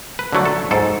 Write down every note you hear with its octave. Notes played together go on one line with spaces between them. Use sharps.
B4
D3 F#3 A3
A4
G#2 A4